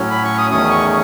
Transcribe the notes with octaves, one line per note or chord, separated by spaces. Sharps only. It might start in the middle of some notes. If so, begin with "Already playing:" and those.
Already playing: A2 F#3 C#4
B5
C#6
D#6
E2 D#3 A3 C#4 D#6
C#6